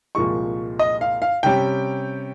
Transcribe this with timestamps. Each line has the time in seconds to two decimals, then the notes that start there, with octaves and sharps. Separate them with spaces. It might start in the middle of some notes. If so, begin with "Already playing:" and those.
0.15 C2 A#2 F3 G#3 C#6
0.79 D#5
1.01 F5
1.22 F5
1.43 C3 G3 C#4 G5